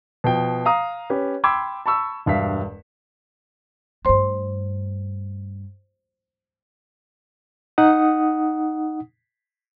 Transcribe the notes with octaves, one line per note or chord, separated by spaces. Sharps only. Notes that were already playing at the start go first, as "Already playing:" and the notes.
B2 F3 G5
F5 A#5 D#6
C#4 G4 B4
G5 B5 C6 D6 E6 G#6
A5 B5 C#6 E6
E1 G2 E5 F5 B6
G2 A3 C5 C6
D#4 F#5 D#6